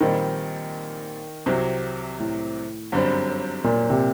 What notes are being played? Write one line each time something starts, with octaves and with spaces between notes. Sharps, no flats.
A#1 A#2 D#3 G3 C4
C2 C3 F#3 C4 G4
A2
G1 F#2 D3 G3 C4
A#2
C3